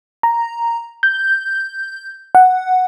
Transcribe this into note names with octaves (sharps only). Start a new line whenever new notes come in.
A#5
G6
F#5